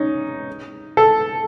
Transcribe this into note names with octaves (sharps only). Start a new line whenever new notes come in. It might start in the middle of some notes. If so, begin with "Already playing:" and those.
Already playing: C#4 D#4
A4